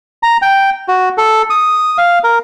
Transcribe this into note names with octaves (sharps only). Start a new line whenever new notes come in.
A#5
G5
F#4
A4
D#6
F5
A#4